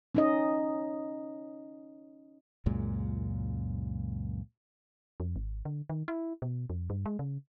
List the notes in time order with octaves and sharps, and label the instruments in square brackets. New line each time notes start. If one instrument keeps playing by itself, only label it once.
[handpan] C#4 D#4 D#5
[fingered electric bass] C#2 F#2 A#2 G#3
[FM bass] F2
G#1
D3
D#3
E4
B2
F2
G2
G#3
C#3